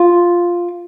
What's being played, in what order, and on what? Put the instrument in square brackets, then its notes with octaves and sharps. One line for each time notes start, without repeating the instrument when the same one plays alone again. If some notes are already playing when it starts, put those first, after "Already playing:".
Already playing: [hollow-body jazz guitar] F4